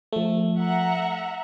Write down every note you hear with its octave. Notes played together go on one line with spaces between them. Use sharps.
F3 A3
E5 F#5 A#5